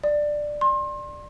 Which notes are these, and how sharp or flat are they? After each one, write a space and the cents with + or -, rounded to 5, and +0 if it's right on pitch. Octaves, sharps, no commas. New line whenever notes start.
D5 +10
C6 +30